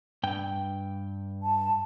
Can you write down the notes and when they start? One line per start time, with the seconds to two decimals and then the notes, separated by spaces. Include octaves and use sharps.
0.23 G2 G5
1.43 A5